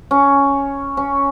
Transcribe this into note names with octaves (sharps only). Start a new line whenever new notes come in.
C#4
C#4